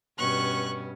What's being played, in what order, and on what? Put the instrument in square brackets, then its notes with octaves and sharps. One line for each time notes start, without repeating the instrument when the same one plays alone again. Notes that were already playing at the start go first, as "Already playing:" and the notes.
[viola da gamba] G2 B2 C#4 [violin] C#6 F#6